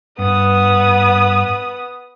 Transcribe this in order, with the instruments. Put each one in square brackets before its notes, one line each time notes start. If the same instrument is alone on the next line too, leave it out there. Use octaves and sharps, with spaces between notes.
[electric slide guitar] G2 [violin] B3 D#6